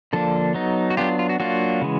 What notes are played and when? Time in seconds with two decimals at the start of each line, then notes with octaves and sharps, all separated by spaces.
0.13 D3 F3 A#3 D4 A4
0.54 F#3 B3 D#4
0.90 F#4
0.97 F#3 B3 D4 F4 G4
1.19 F4
1.29 F#4
1.40 F#3 A#3 D4 F4 F#4
1.81 C#3 E3 G#3